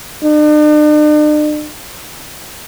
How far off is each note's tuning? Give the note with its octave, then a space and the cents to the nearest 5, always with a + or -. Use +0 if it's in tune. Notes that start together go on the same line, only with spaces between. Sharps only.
D4 +45